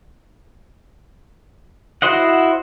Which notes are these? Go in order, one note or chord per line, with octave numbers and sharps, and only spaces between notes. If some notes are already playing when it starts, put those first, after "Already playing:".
E4 F#4 C5 D#5 F#5